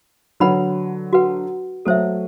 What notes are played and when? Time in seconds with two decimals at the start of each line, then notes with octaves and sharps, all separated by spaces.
0.40 D3 F#3 B4 F#5 B5
1.13 F#4 B4 F#5
1.85 F#3 A3 A4 C5 E5